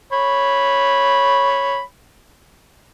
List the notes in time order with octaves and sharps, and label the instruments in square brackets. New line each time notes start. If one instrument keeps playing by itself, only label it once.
[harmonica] C#5 B5